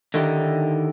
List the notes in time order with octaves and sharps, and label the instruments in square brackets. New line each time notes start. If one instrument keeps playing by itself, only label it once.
[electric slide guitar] D3 D#3 D#4 E4 G4